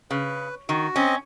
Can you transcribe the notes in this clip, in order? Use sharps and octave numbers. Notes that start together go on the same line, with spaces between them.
C#3 B4
D#3 F#4
C4 C#4 D#5